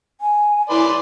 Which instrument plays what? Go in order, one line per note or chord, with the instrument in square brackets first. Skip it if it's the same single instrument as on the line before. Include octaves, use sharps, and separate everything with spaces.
[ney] G#5
[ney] E4 [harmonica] B4 D5 C6